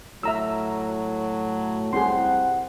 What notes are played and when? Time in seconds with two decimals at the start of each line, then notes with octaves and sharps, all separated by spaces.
0.23 A2 F#3 E5 A#5 E6
1.93 C2 C4 G#4 F#5 C6